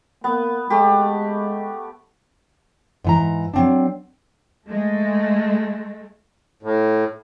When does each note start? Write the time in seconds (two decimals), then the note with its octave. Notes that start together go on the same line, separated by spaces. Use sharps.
0.24 A#3 B3
0.70 G#3 A3 G4
3.04 G#2 E3 A#5
3.54 F#3 C4 D4
4.66 G#3 A3
6.63 A2